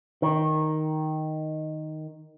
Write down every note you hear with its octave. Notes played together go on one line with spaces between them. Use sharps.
D#3